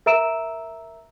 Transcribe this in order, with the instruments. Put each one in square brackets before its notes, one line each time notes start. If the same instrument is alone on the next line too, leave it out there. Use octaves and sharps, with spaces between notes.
[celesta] A#4 E5 A#5 E6 D7 E7